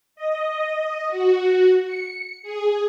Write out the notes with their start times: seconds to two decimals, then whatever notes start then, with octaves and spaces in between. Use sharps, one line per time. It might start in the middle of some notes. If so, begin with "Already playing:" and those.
0.16 D#5
1.09 F#4
1.84 C#7
2.43 G#4